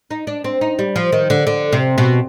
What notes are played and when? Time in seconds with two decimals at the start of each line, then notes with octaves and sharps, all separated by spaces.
0.11 D#4
0.27 D4
0.44 C4
0.61 D#4
0.79 G3
0.96 F3
1.12 D#3
1.30 D3
1.47 D3
1.73 C3
1.98 B2